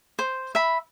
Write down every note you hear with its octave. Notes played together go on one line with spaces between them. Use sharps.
C5
E5 B5